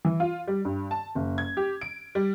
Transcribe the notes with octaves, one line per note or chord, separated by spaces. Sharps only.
E3
F4
G3
G2
A5
F#1
G#6
G4
D7
G3